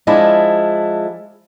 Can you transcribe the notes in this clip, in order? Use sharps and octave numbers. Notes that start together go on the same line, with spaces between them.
F3 G#3 D4 E4